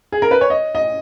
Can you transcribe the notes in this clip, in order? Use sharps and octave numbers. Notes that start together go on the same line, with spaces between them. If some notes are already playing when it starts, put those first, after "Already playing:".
G#4
A#4
B4
C#5
D#5
D#5